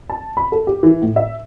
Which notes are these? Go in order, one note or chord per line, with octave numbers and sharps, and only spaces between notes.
A5
B5
A4
G4
E3
A2
E5